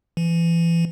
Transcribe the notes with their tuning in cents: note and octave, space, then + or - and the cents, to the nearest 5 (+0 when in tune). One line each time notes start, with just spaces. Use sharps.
E3 +30